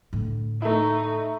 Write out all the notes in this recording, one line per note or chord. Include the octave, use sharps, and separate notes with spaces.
A2 D3
A3 D#4 E4